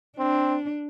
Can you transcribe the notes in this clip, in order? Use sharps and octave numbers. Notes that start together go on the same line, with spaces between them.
C4 D4